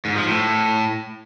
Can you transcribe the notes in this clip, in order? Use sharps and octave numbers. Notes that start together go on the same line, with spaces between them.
G#2
F3
A2